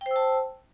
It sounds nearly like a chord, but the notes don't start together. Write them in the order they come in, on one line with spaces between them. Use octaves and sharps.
G5 C5 E6 A5